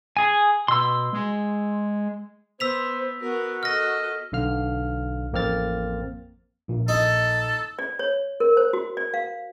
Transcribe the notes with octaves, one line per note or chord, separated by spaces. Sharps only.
G#4 G#5
B2 C6 E6
G#3
B3 C5 E6 B6 F7
B3 F#4 A#4
A4 D#5 F6 A#6
B1 D3 F5 F6
A1 F2 A#3 C4 F6 A6
A#1 A#2
D#4 A4
D5
C#5
A#4
C5
F#4
D5
F5